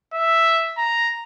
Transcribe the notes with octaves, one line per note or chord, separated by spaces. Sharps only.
E5
A#5